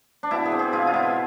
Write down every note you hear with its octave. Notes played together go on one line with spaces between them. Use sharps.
D4
B2 E4
G#4
C4
G#4
B2 F4
F4
B2 E4